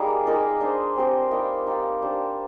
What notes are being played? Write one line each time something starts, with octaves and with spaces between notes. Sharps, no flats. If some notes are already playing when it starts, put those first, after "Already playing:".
Already playing: G3 A#3 D#4 G#4 A#4
G#3 D#4 A#4 D5
D4 G#4 C5 D#5
C4 G4 C5
G3 A#3 D#4
D#4 G4 D5 F5
A#3 D4 G4 C5